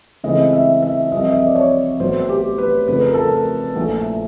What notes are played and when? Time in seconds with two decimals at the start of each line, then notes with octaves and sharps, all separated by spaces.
0.24 C#2 C#3 E3 A3 C4 D#5
0.53 E5
0.82 E5
1.12 C2 C3 F3 D#5
1.27 E5
1.36 D#5
1.47 D5
1.56 C#5
2.00 A1 A2 F#3 B3 C5
2.29 G4
2.58 B4
2.88 F1 F2 C#3 B4
3.01 A#4
3.14 A4
3.27 A#4
3.75 A#1 A2 F3 A3